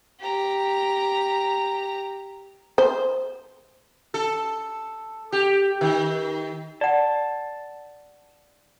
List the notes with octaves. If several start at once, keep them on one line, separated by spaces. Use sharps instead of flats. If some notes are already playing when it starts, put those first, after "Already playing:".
G4 A#5
C5
A4
G4
D#3
D5 F#5 A5